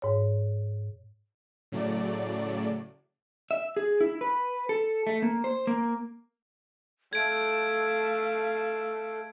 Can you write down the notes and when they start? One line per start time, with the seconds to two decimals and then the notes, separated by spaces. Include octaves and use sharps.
0.02 G#2 C#5
1.72 A2 C#3 F#3 A3 D5
3.51 E5
3.77 G#4
4.01 E4
4.21 B4
4.69 A4
5.07 A3
5.23 A#3
5.44 C5
5.67 A#3
7.13 A3 A4 F5 G#6 D7